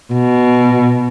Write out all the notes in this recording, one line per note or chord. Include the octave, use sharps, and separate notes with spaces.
B2